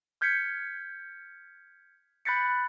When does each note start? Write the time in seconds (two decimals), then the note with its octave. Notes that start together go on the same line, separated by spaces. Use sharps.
0.21 F6 G6 G#6 B6 C#7
2.25 B5 F#6 G6 A6 B6 C#7